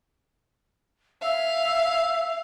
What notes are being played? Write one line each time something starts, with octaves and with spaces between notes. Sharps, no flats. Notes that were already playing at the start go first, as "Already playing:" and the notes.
E5 F5